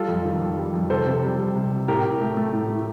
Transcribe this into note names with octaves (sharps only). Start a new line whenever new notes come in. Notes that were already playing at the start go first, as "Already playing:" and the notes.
Already playing: G3 F4 A4
F2
D#3
F2
G3
F2
C3 A4 C5
C3
G3
G3
C3
C3
A2 G4 A#4
A2
A3
A3
A2
A2